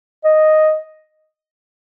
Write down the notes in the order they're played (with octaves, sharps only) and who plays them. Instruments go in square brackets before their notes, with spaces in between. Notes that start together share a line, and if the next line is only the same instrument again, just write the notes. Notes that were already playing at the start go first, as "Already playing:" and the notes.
[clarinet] D#5